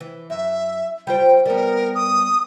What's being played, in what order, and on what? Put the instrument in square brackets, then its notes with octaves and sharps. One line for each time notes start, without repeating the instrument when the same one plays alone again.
[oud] E3
[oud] F#2 [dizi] E5
[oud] G3 F4 C5 [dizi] G5
[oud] G3 B3 [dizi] A#4
[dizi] D#6